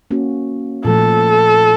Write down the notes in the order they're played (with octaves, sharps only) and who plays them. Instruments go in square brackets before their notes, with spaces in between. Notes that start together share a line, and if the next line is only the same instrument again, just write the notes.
[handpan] A#3 C#4 F#4
[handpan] A#2 F3 A3 [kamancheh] A4